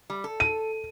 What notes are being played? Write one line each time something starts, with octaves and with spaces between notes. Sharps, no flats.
G3
A4
D#7